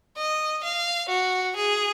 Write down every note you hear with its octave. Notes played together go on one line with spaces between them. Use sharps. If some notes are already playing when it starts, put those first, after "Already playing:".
D#5
F5
F#4
G#4